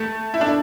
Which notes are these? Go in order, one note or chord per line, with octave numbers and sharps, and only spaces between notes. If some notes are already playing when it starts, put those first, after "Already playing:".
Already playing: A3
E4
D4